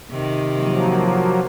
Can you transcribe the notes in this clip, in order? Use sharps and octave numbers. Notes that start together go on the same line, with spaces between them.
C3 D#3
F3 F#3 A#3